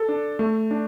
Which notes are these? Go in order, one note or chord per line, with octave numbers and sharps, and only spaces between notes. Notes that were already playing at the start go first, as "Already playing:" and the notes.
Already playing: A4
D4
A3
D4